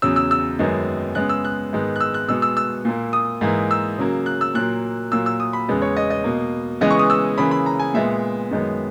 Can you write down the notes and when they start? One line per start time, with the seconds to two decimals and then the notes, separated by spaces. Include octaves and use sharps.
0.02 E2 C#3 F#3 E6
0.16 E6
0.31 E6
0.59 F#2 D#3 G#3 B3
1.15 C#3 G#3 B3 F#6
1.29 E6
1.45 F#6
1.73 G#2 D#3 G#3 B3
1.96 F#6
2.00 E6
2.14 F#6
2.28 B2 G#3 B3 E6
2.42 E6
2.57 E6
2.85 A#2 A#3
3.13 D#6
3.41 G#2 E3 A#3
3.71 E6
3.98 C#3 F#3 A#3
4.26 F#6
4.41 E6
4.55 A#2 F#3 A#3 F#6
5.12 A#2 F#3 A#3 E6
5.26 E6
5.40 D#6
5.53 B5
5.69 E2 C#3 G#3 B3
5.82 C#5
5.97 D#5
6.10 D#5
6.24 B2 A#3
6.81 C#3 E3 G#3 B3 D#5
6.90 C#6
6.99 D#6
7.10 E6
7.38 C#3 E3 A#3 B5
7.51 B5
7.66 A#5
7.79 G#5
7.94 A#2 G#3 B3 E5
8.51 F#2 D#3 G#3 B3